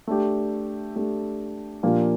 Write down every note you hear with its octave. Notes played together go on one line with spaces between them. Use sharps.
A3 D4 G4
A3 D4 G4
A#2 F3 A#3 D4 G4